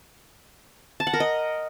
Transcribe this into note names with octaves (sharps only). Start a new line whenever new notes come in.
A5
F#5
A#4
D#5